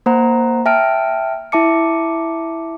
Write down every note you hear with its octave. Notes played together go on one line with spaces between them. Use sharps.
A#3 C5 F#5 A#5
E5 G5 A5 F6 D7
E4 E5 A5 D6 C#7